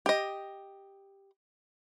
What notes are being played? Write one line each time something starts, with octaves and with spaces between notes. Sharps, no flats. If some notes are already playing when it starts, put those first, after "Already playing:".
G4 D#5